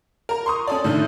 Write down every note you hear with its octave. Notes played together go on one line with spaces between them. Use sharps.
A#4 A#5
C6 C#6 D#6
C#4 A4 D5
A2 D3 D#3 A3